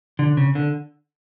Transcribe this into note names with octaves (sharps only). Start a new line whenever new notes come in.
D3
C#3
D3